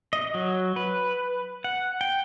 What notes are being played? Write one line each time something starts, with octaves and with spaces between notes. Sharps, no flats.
D#5
F#3
B4
F#5
G5